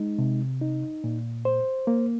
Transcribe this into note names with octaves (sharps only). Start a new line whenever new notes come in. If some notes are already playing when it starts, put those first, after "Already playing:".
Already playing: G#3 D#4
C3
D#4
A#2
C5
A#3